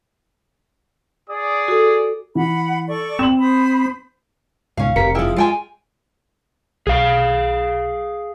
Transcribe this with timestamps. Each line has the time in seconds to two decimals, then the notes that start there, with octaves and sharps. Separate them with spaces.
1.29 G#4 D5 D#6
1.68 F#4 A4
2.35 E3 F#5 B5
2.88 A4 D5 C#6
3.19 C4 E7 F#7
3.39 C5 B5 D#6
4.77 C#2 G#2 B2 C#4 F5
4.96 F1 G4 G#4 A#4 B6 C#7
5.15 F3 E4 F4 G#4 F5 G5
5.36 G#3 F4 G5 G#5
6.87 B1 G#4 F5